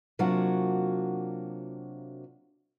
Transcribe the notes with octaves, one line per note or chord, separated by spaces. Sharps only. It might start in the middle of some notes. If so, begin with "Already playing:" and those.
C3 F#3 A#3 D4 F4 F#4